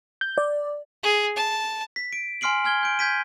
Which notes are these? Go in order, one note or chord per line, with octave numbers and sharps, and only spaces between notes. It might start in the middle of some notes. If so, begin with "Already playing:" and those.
G6
D5
G#4
A5
B6
D7
G#5 C6 F6 C7 D7 F#7
G#5 F6 G#6 G7
G6 D7
G6 G#6 B6 D#7